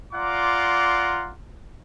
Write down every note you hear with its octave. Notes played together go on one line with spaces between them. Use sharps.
F4 D5 F#5 A#5 C6 D6